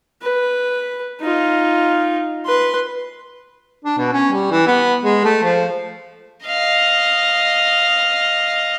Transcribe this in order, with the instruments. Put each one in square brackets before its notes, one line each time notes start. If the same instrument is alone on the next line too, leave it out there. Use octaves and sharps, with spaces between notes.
[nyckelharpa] B4
D#4 F4
B4 C6
[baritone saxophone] D4
B2
C#4
G3
E3
B3
G#3
A3
F3
[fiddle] D#5 F5